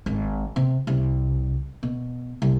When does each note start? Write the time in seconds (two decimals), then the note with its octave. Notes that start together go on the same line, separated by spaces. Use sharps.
0.06 G#1
0.56 C3
0.87 C2
1.83 B2
2.42 C2